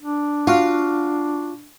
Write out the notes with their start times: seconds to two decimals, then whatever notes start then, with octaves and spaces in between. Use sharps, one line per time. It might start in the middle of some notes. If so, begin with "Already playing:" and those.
0.02 D4
0.47 F4 F#4 F5